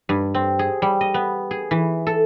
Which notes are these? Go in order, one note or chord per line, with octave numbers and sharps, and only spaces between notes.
G2
C4
G#4
G3
D#5
B3
G#4
E3
A4